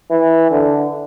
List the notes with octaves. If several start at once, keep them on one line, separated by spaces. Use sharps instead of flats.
E3
D3